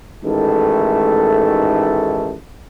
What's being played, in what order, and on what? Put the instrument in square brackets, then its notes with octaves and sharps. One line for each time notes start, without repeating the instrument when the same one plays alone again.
[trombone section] A1 G#2 D#3 A3 A4